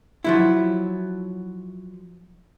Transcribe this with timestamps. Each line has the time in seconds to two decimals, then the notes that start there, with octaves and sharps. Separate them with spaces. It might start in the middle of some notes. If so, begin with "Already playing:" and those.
0.24 F3 F#3 E4